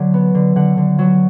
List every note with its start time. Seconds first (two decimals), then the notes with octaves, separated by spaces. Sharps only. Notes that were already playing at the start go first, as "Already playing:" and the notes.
Already playing: D3 F#3
0.14 B3
0.35 D3
0.56 D3 F#5
0.77 D3
0.99 F#3